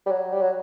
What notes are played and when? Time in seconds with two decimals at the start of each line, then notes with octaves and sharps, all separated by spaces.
0.06 G3
0.11 F#3
0.33 G3
0.42 F#3